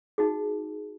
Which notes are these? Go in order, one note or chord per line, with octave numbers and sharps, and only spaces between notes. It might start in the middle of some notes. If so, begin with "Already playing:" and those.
D#4 F#4 G#4